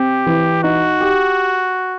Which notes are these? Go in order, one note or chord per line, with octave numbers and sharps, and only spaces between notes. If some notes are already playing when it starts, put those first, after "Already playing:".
Already playing: C4 G4
E3
D#4 F#4
G4